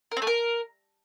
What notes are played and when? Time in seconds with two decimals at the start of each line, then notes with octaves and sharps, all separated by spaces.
0.11 A#4
0.17 C4
0.22 A3
0.27 A#4